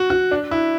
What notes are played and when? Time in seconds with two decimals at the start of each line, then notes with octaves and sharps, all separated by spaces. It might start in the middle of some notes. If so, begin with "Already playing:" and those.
Already playing: F#4
0.10 F#4
0.31 D4
0.51 E4